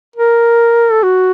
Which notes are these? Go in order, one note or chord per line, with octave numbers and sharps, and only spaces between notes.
A#4
A4
F#4